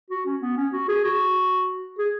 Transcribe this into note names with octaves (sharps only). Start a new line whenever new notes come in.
F#4
C#4
B3
C#4
F#4
G#4
F#4
G#4